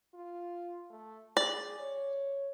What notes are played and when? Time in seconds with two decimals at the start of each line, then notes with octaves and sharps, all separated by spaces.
0.14 F4
0.91 A3
1.37 G#4 D5
1.79 C#5